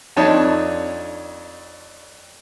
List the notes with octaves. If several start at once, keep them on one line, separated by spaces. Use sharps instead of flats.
F2 C4 D4 D#4 C#5 A5